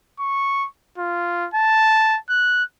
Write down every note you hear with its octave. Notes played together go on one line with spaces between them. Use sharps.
C#6
F4
A5
F#6